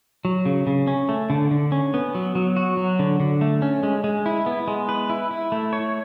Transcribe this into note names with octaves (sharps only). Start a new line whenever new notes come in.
F#3
C#3
C#3
C#4
A3
D3
D3
C#4
B3
F#3
F#3
F#4
F#3
D3
D3
A3
C#4
G#3
G#3
E4
B3
G#3
B4
E4
E4
A3
C#5